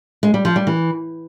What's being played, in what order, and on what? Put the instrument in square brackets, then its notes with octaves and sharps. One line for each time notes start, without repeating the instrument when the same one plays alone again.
[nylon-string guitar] G#3
G3
F3
G3
E3